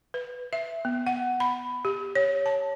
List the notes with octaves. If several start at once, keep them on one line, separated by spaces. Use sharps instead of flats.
B4
E5
B3
F#5
B5
G4
C#5
A5